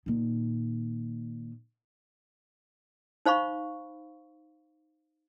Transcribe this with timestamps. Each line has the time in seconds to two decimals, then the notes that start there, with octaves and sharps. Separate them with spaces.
0.06 A#2 D#3
3.26 D#4 C5 F5 B5 C#6